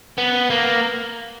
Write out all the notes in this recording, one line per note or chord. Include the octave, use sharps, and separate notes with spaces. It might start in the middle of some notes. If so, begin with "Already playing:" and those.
B3
A#3